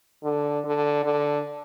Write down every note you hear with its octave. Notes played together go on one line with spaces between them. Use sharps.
D3
D3
D3